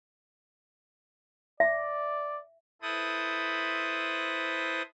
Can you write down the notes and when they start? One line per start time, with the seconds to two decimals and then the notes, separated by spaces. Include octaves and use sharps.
1.60 D5 E5
2.82 E4 A4 B4 C5 D#6